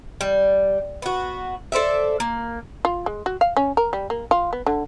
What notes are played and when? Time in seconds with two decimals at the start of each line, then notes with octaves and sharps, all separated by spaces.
0.21 G3
1.02 B3 F#4
1.72 A4 C5 D5 E5
2.20 A#3
2.85 F4
3.06 G#3
3.26 F#4
3.41 F5
3.57 C#4
3.77 A#4
3.93 G3
4.10 A#3
4.31 F4
4.53 B3
4.66 D3